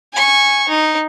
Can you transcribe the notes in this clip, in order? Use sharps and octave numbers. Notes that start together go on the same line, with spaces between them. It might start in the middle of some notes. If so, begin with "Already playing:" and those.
G#5 C#6
D#4